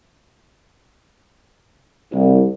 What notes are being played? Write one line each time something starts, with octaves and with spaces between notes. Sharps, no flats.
C2